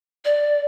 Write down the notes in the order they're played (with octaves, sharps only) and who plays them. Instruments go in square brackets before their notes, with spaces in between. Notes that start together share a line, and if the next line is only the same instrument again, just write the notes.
[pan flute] D5